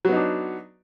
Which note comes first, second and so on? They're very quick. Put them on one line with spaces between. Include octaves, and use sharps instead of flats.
F#3 B3 D#4 D4